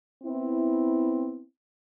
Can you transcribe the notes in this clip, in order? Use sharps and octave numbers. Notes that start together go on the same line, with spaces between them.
B3 C4 E4